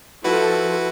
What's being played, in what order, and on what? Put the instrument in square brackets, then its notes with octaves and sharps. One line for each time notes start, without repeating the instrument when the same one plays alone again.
[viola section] F3 A4 [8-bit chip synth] E4 F#4 B4